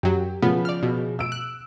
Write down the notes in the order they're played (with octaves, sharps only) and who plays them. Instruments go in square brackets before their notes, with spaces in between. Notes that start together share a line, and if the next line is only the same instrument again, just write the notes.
[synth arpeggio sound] F#2 F#3 [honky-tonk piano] G4
[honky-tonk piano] C#3 F3 [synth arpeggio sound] B3
[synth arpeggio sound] D5 F6
B2
[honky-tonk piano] E6 D7
[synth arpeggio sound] F#6